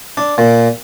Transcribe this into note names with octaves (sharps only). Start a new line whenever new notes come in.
D4
A#2